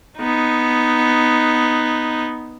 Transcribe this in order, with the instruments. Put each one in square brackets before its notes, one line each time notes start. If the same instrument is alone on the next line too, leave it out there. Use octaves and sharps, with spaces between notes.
[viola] B3 D#4